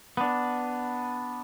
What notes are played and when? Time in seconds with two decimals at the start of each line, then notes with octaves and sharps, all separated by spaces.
0.17 B3 D4